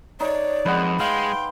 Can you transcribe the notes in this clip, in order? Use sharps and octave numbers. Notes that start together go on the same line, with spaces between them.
D#4 C#5 D5
F2 G#3 B4 F#5
G#3 F5 G5 C6